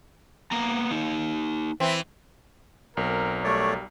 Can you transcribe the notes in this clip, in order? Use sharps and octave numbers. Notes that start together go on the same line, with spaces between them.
A#3 B3 A#5
A#3 D#4
E3 C4
B1 C4 A#4
G3 A3 A#4 C#5 D5